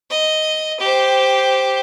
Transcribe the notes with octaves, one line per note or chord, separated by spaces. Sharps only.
D#5
G4 C5